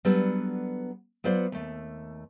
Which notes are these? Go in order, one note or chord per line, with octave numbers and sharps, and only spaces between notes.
F#3 G3 B3 D4 A4 B4
F#3 B3 F4 C5 D5
D#2 A3